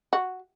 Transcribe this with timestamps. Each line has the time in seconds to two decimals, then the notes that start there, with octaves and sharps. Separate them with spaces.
0.13 F#4